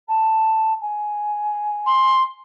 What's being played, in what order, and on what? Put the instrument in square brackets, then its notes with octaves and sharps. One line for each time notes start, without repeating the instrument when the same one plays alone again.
[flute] A5
G#5
[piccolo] C6